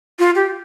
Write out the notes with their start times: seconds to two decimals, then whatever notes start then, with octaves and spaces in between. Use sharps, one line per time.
0.19 F4
0.35 G4